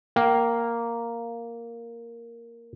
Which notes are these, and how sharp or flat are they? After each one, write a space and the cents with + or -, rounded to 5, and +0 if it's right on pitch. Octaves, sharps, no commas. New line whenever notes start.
A#3 +0 G5 -25